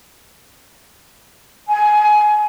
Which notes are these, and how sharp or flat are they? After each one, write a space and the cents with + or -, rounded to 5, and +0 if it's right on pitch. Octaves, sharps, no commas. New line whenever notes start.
G#5 +20